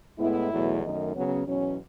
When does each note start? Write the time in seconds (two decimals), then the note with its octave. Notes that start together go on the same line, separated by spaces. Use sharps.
0.18 A2 G#3 B3 E4
0.50 E2 B2 F#3 A3
0.82 F#2 D#3 A3 D#4
1.13 C#3 F#3 B3 C#4
1.45 E2 B2 F#3 C#4